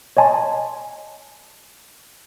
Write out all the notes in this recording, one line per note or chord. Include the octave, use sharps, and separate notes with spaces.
C#5 D#5 G#5 A5 C6